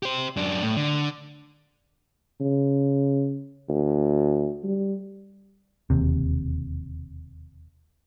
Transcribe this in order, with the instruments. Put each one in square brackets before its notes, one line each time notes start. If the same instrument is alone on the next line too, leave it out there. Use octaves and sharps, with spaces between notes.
[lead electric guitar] G4 C5
F#2 D4
A2
D3
[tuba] C#3
D2
G3
[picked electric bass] E1 D#2 C3